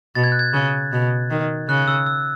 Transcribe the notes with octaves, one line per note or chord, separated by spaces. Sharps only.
B2 A6
G#6
F#6
G#6
C#3
B2
D#3
C#3 F#6
E6
E6